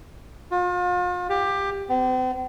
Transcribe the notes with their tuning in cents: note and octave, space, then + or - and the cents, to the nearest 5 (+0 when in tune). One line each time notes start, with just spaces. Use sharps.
F4 +40
G4 +15
C4 -45